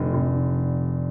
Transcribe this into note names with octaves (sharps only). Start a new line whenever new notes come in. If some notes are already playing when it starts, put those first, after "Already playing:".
Already playing: F1 D3
F1